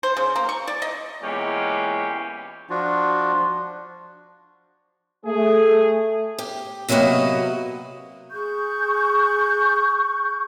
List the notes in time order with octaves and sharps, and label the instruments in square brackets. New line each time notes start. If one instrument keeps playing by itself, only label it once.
[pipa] C5
C#3
A#3
C#6
D5
D#5
[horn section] A#2 E3 G#3 B3 C#4 G4
[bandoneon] F3 D4 F4 F#4
[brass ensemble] A3 G#4
[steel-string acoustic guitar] G4
C3 F#3 A#3 B3 F#4 D#5
[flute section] G#4 C#6 F#6 G6